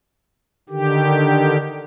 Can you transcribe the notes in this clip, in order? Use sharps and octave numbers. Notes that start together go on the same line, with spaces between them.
D3 D#3 G4